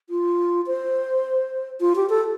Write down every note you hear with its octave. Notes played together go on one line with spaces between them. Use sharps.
F4
C5
F4
G4
A4